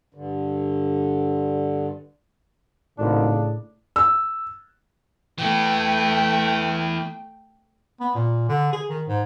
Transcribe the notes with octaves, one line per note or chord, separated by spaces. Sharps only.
G2 D3
G#1 A2 C#3 D4
E6
E3 A3 B3 G5
B3
A#2
D3
G#4
D#3
G#2